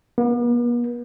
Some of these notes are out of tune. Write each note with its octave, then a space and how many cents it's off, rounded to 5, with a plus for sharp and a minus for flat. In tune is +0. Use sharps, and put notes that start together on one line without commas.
B3 -45